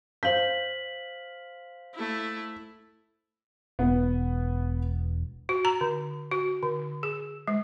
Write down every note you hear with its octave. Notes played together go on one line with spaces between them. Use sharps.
C5 F5 G6 B6 F#7
A3 E4
E1 B3
F#4
A#5
D3
F#4
D3
G#4
G#3